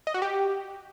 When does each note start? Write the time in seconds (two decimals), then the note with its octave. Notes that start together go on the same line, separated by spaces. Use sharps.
0.07 D#5
0.14 F#4
0.22 G4